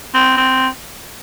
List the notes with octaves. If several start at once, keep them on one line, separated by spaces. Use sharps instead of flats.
C4
C4